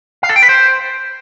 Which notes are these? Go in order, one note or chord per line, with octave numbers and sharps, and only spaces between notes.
F5
A4
G5
B4
C5